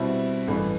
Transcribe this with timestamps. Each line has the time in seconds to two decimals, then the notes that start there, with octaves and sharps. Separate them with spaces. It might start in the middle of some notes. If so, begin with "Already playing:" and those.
Already playing: B2 G3 C4 E4
0.48 A1 G2 E3 A3